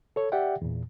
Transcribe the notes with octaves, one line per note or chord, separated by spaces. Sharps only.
A4 C#5
G4 D5 E5 F#5 G5
E2 A#2